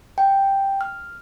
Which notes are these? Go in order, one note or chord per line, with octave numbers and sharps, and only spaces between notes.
G5
F6